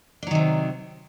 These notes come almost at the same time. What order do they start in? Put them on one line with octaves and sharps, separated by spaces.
D4 F#3 D#3 C3